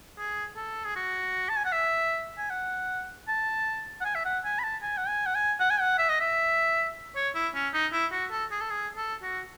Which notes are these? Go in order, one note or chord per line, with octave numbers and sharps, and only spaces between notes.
G#4
A4
G#4
F#4
A5
G#5
F#5
E5
G#5
F#5
A5
F#5
G#5
E5
F#5
G#5
B5
A5
G#5
F#5
G#5
F#5
G#5
F#5
G#5
F#5
E5
D#5
E5
C#5
E4
C#4
D#4
E4
F#4
A4
G#4
A4
G#4
A4
F#4